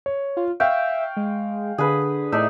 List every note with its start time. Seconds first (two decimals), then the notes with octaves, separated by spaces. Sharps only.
0.06 C#5
0.37 F4
0.60 E5 F5 G5 C#6
1.17 G#3
1.78 D3 G#4 B4
2.32 A2 D#4 D5 E5